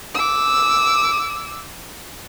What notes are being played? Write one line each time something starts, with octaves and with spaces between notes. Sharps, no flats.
D6 E6